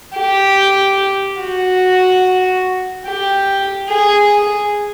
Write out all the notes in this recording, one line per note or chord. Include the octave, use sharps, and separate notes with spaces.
G4
F#4
G4
G#4